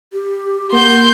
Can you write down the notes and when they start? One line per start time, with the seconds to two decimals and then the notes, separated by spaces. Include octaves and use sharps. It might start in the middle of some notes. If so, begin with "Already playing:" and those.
0.13 G4
0.73 A#3 F#5 C6 G6